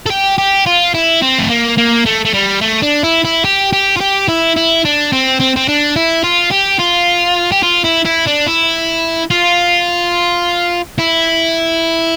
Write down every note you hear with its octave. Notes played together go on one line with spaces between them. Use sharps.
A4
G4
G4
F4
E4
C4
A3
A#3
A#3
A3
A3
G3
A3
D4
E4
E4
G4
G4
F4
G4
E4
E4
D4
C4
C4
C4
D4
E4
F4
G4
F4
G4
F4
E4
E4
D4
E4
F4
E4